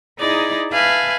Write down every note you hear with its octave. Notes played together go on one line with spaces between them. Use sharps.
D#4 E4 G#4 D5 A#5
B4 E5 F5 G#5 A5 F#6